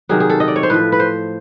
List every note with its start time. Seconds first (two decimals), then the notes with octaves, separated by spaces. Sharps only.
0.09 C3 D#3 F#3 G#4
0.20 G#4
0.30 A4
0.40 D#5
0.48 D5
0.56 C#5
0.63 C5
0.70 A2 F3 B4
0.92 B4
1.00 C5